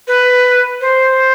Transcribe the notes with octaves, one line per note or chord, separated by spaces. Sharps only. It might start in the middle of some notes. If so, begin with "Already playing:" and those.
B4
C5